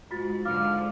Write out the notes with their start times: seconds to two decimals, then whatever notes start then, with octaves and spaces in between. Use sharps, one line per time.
0.11 G#2 F4 F#4 A6
0.45 G#2 D3 F3 F4 F5 D6 F6